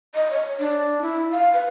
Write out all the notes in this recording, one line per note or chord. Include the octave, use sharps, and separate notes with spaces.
D#5
C#5
D4
E4
F5
B4